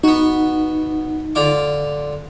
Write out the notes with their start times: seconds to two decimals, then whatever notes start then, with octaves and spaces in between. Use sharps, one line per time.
0.04 B3 D#4 F#4
1.35 D3 F4 D6